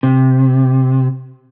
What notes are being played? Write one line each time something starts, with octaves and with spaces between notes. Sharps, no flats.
C3